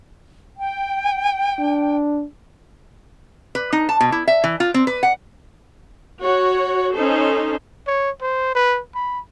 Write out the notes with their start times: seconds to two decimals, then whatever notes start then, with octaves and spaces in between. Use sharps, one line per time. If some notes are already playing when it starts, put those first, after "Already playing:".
0.57 G5
1.59 D4
3.55 B4
3.72 D#4
3.89 A5
4.00 B2
4.12 E4
4.27 E5
4.44 E3
4.60 F4
4.74 C4
4.87 B4
5.03 F#5
6.20 F#4 C#5
6.95 C#4 D#4 A4 C5
7.87 C#5
8.22 C5
8.55 B4
8.95 B5